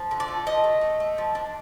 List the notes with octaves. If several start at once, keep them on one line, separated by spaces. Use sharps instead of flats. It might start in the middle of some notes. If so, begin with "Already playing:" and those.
Already playing: F3
D3
D5
A3
F3 D#5
A3
A3
A3
F3
D4